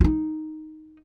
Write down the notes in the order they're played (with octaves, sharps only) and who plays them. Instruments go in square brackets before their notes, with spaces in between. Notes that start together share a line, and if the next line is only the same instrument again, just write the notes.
[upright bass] D#4 F4